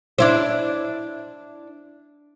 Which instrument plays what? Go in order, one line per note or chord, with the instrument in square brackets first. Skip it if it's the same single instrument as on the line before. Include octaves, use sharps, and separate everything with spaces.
[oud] D4 E4 C5